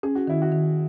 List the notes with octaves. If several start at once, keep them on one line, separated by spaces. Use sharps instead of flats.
C#4 G#4
F#4
D#3 E4
F#4
D#3